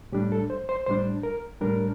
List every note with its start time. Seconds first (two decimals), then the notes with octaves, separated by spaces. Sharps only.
0.12 A2 G3 D4 G4
0.32 A4
0.50 C5
0.69 C5
0.86 A2 G3 D4 C5
1.23 A#4
1.61 A2 G3 D4 A#4